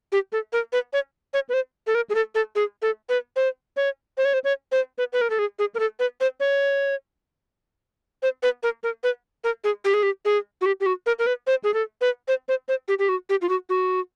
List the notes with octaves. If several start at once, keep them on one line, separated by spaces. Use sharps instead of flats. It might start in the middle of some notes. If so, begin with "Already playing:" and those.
G4
A4
A#4
B4
C#5
C#5
B4
C5
A4
A#4
G#4
A4
A4
G#4
A4
B4
C5
C#5
C5
C#5
C5
C#5
C5
B4
B4
A#4
A4
G#4
G#4
A#4
A4
B4
C5
C#5
C5
B4
A#4
A#4
B4
A#4
G#4
G4
G#4
G4
G#4
F#4
G4
G4
F#4
A#4
A#4
B4
C5
G#4
A4
B4
C5
C5
C5
G4
G4
F#4
G4
F4
F#4
F#4